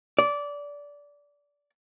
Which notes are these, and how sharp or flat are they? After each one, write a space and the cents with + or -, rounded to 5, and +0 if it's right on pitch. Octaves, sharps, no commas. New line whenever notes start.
D5 -20